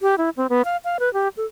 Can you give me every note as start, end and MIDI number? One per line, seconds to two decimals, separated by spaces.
0.02 0.15 67
0.18 0.30 64
0.37 0.47 60
0.50 0.62 59
0.65 0.77 77
0.84 0.97 77
1.00 1.12 71
1.13 1.28 67
1.37 1.46 69